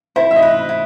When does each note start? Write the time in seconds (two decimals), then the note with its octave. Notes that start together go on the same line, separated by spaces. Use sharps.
0.16 E4 C5
0.31 E5
0.36 D#5
0.42 B4
0.69 E4